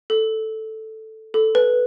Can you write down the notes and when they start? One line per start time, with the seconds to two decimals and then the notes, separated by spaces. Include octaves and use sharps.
0.10 A4
1.34 A4
1.55 B4